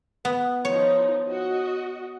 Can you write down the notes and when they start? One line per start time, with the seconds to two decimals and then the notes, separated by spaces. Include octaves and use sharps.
0.25 B3
0.65 F3 D#4 C#5
1.26 F#4 D#5